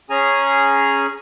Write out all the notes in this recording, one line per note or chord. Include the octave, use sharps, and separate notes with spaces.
C#4 G#4 G#5 A#5